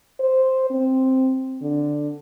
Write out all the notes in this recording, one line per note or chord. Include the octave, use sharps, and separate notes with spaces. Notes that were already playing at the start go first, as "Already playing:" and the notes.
C5
C4
D3